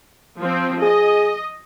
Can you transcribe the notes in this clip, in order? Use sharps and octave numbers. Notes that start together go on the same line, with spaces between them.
F3 C4
G#4 D#5